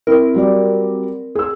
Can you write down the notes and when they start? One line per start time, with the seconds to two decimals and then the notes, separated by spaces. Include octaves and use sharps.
0.07 C4 E4 A#4
0.34 F#3 G3 D5
1.35 G#4 E6